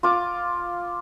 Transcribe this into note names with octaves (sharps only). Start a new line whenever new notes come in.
F4 D6